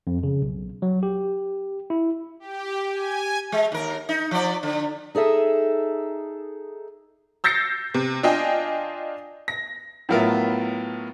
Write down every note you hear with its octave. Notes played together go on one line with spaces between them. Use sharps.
F2
C#3
B1
F#3
G4
E4
G4
G#5
G#3
D#2 A#4
D#4
F3 D5
D3
D#4 G#4 A4 E5
E6 G6 A6 A#6 C7 C#7
C3
D4 F4 D#5 G5 G#5
A#6
A2 F#3 B3 F4 A#4 E5